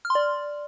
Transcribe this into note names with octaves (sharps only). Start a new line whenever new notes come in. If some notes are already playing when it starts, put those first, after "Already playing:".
F6
C6
D5